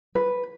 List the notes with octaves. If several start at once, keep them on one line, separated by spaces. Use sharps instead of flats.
B4